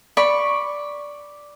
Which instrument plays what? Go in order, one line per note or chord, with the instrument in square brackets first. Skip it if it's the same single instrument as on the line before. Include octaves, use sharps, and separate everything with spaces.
[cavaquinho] D5 B5 C#6